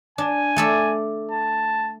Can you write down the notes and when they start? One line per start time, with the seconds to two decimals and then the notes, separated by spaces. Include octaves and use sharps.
0.18 D4 G#5
0.56 A3 A4 D5
1.31 A5